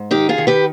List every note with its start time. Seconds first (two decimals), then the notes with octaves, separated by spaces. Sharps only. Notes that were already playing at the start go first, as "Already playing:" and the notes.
Already playing: G#2
0.11 D#3 D#4 G4
0.29 F4 G#4
0.38 D#3
0.47 G4 B4